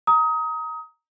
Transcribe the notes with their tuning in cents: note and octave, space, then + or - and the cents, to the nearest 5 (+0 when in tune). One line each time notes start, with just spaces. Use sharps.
A#5 +0 D#6 +25